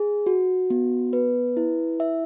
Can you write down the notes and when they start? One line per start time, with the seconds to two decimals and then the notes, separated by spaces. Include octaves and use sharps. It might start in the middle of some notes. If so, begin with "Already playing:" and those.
Already playing: G#4
0.26 F#4
0.70 B3
1.13 B4
1.57 E4
2.00 E5